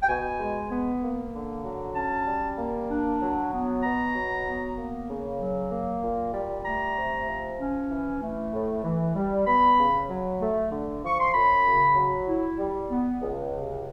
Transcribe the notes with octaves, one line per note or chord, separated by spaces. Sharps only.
G5
B2 G#5
G#3
B3
A#3
D3
F#3
C#4 A5
G3
A#3
D4
F#3
B3
B2 A#5
F#3
B3
A#3
C#3
F#3
A#3
A#2
G3
A3 A#5
C3
F3
C#4
E3
A3
A2
E3
G3
B3 B5
C#3
F#3
A3
D3
F3 C#6
C6
F#2 B5
C#3
F#3
E4
G3
B3
C#2
C3